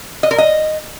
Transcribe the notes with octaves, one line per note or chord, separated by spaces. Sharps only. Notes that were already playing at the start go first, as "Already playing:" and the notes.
D#5
A#4
D#5